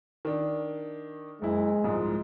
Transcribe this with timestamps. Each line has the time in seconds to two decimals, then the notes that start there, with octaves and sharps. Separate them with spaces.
0.25 D#3 D4
1.42 F#1 G#3 E4
1.84 C2 G#2 F3